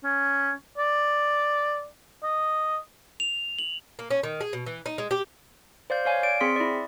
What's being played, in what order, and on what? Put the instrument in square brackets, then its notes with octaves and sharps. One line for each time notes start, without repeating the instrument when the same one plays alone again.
[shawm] C#4
D5
D#5
[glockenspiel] F7
F#7
[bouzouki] A#3
C#4
D#3
G#4
B2
E3
D#4
G#3
G4
[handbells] C5 D5 F5 G6
C#5 F5 G#5
D5 D7
C4 G#4 C6 B6
E4 D5